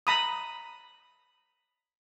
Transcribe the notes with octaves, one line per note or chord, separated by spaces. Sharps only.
A#5 B5 D#6